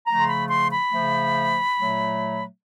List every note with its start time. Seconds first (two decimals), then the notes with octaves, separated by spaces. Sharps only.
0.07 C#3 F3 A3 A#5
0.19 C6
0.28 B5
0.49 C6
0.71 B5
0.92 C#3 F3 A3
1.78 A#2 F#3 A3